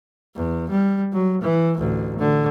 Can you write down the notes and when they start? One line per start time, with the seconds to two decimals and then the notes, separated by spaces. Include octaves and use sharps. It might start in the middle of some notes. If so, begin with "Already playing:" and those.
0.36 E2
0.70 G3
1.13 F#3
1.42 E3
1.77 A1 D2
2.19 D3